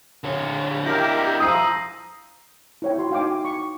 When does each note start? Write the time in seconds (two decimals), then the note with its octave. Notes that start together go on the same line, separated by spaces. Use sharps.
0.24 D3 C#5
0.86 D4 E4 G4 A#4 G6 A#6
1.40 F3 A#5 D#6 E6 C7 D#7
2.82 E4 C#5 G5
2.98 F#4 C6
3.11 D#4 F5 G5 G#5 D6
3.45 C#6